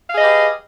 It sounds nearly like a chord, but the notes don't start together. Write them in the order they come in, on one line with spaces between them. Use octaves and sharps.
F5 G#4 D#5 B4 G4